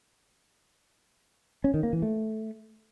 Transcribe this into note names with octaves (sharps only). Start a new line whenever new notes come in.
C#4
D#3
A#3
E3
A3